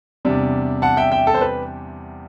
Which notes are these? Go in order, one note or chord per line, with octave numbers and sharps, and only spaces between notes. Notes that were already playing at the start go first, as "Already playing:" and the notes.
E2 C3 G3 D4
F#5 A5
E5 G5
E5 G5
A4
C5
B4